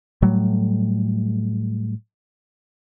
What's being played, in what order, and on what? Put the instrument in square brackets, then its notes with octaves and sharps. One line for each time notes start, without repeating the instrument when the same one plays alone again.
[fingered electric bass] A2 F#3 G3 A3